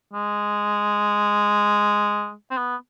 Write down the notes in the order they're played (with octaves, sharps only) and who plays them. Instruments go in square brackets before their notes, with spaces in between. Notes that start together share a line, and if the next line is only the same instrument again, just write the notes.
[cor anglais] G#3
C4
B3